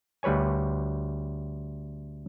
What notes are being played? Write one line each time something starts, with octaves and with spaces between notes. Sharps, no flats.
D2 G3 B4 C#5 G#5